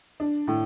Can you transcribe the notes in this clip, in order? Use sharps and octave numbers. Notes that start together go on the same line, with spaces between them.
D4
A2